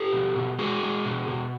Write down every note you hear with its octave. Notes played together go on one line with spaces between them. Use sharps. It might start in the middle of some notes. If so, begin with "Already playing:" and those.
Already playing: G4 A4
B2
B2
G#3 F#4 G#4
G#3
B2
B2